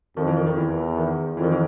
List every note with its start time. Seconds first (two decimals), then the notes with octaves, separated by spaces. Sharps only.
0.17 F2 D#3 F3
0.27 E3
0.37 D#3
0.47 D#3
0.56 E2 E3
0.97 D#3
1.37 F2 E3
1.43 D#3
1.52 E3